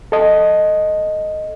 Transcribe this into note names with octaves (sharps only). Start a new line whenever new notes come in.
A4 D#5